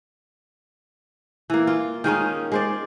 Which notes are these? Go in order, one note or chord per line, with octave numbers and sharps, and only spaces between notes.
E3 A#3
F4
D#3 G#3 C#4 D#4
G#3 C5 D5